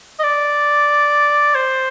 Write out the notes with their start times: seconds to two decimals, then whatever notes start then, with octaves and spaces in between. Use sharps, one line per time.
0.19 D#5
0.23 D5
1.55 C5